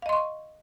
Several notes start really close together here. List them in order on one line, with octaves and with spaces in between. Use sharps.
F5 D#5 C6 C#6